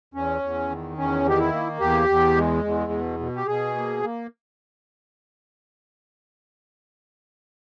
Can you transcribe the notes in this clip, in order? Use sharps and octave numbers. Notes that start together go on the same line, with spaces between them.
E2 C#4
E2
D#3
E2 C#4
D#3 G4
E4
A#3
E2 G4
E2
G#3
E2
B2
B2
G4
B2 G#4
A#3
A#3